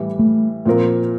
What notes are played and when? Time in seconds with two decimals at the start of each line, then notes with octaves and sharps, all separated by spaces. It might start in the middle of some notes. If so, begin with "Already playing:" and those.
Already playing: A2 E3 G3
0.19 A3
0.65 A#2 F3 C4 F4 A#4